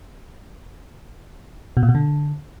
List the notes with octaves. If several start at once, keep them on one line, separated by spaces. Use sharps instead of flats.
B2
A#2
B2
D3